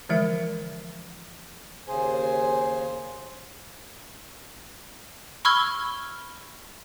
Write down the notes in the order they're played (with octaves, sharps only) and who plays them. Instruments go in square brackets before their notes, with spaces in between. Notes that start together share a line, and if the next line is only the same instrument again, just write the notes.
[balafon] D3 E3 F3 G#3 E5
[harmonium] D#2 C#3 G#4 C5 G#5
[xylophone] B5 C#6 E6 F6 G#6 G7